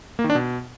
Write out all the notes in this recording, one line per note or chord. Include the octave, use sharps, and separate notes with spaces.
A#3
D#3
D4
B2